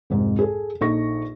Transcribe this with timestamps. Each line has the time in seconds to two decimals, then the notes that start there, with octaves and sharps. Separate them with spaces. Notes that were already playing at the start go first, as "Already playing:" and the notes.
0.10 C2 F2 G#2 G#3
0.39 G#4 A4
0.81 A#1 D#4 A4 C#6 A#6